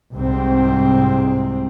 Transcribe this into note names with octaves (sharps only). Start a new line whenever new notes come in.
C2 G#2 C4